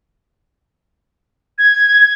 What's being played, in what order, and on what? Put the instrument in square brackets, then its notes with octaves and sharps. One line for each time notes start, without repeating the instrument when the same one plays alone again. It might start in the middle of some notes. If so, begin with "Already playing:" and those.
[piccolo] G#6